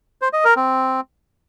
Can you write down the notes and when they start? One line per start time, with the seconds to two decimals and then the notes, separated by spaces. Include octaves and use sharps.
0.22 C5
0.33 D#5
0.45 A#4
0.56 C4